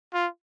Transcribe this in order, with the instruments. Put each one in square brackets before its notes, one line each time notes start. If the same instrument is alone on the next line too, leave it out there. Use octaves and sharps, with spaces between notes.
[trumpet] F4